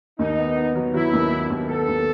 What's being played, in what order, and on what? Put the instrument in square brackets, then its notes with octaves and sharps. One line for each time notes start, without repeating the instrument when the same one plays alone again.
[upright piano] D#2 [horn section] D#4
[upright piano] B3
B3
F#3
[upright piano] F#3 [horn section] E4
[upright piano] D#2
B3
D#2
[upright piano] B3 [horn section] A4
[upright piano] D#2